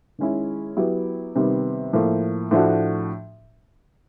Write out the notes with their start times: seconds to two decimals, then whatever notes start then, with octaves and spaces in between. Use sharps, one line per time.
0.19 D#3 G#3 C#4 E4
0.77 F#3 B3 E4 G4
1.36 C3 D#3 G3 B3
1.93 A2 F3 A#3
2.51 A2 F3 A3 D4 F#4